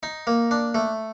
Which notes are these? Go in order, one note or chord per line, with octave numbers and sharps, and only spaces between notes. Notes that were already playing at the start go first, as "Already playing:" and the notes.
D#4
A#3
D4
A3